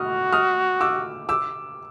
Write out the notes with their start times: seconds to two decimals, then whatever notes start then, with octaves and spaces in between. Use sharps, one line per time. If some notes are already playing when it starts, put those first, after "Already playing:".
Already playing: F#4 D#6 F6
0.33 D#6 F6
0.81 D6 E6
1.29 D6 E6